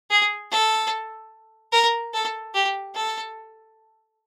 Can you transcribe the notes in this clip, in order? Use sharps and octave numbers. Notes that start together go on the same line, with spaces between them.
G#4
A4
A#4
A4
G4
A4